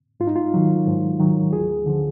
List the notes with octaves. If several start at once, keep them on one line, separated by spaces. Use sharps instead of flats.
G#2 F4
D#4
F4
D#3 F#3
G#2
D#3 F#3
D2 G#4
D3 F3